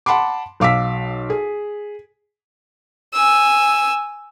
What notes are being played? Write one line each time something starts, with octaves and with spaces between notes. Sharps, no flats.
F#5 A5 B5 C6 D6
B1 F5 D6 E6 B6
G#4
G#5 E6